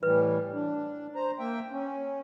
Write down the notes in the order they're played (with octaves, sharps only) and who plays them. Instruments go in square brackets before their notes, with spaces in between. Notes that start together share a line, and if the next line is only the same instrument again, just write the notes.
[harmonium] A2 E3 G3 [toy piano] B4
[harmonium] D4
C5 A#5
A#3 E5 G5
C#4